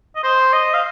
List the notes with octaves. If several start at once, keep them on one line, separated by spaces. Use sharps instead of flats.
D#5
C5
D#5
F5